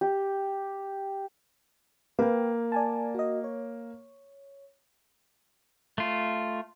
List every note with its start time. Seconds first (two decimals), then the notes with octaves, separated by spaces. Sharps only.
0.01 G4
2.19 A#3 B4 F5 G5
2.72 D5 G#5 A5
3.15 F#4 D#5
3.44 C#5
5.98 A3 F4